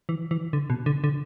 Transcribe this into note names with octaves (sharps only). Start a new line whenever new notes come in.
E3
E3
D3
B2
D3
D3